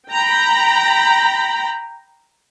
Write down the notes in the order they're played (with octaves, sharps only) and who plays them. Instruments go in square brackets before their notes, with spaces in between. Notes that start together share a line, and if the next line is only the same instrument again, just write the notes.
[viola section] G5 A#5 B5